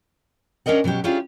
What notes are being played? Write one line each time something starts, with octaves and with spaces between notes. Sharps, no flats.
C#4 D4 A#4 D#5 F#5
B2 F#3 C#4 G4
C#4 D4 E4 F4 G4 G#4